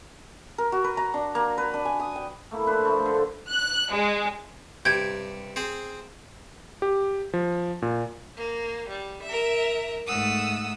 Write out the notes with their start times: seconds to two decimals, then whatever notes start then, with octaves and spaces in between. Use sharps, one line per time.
0.58 A#4
0.72 F#4
0.84 B4
0.97 A#5
1.14 D4
1.35 A#3
1.58 B4
1.74 D4
1.85 G#5
2.00 D#6
2.16 G5
2.51 A3 A#3 E4
2.66 D4 B4 C5
2.85 F3 A3
3.05 D3
3.49 F#6
3.91 G#3
4.85 G2 C3 G6 G#6 D7
5.56 C4 G#4 C5
6.82 G4
7.33 F3
7.82 A#2
8.38 A#3
8.89 G3
9.24 A#4 E5
10.07 G#2 A3 F#5 D#6 E6